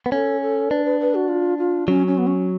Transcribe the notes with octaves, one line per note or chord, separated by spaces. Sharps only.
B3
C#4 A4
A4
D4 B4
B4
B4
F#4
F4
F4
F#3 C#4
C#4
B3
C#4